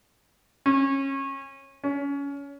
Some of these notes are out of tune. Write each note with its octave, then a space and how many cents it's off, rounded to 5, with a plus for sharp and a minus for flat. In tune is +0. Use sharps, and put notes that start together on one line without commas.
C#4 -25
C#4 +25